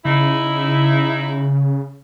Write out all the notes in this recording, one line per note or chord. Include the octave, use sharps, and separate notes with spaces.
C#3 D#4 E4